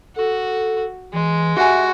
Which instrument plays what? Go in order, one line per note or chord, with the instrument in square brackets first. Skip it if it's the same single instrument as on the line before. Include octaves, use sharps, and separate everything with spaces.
[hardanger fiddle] F#4 [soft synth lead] A4
[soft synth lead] E3 [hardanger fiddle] G#3
[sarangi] F#4 [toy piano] G4 G#5 [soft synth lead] E5